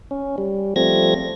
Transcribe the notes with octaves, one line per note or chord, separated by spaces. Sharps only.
C#4
G3
F3 G3 A3 C4 G#6 A#6